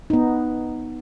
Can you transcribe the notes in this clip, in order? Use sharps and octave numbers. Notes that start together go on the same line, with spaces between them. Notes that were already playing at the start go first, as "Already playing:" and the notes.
B3 D#4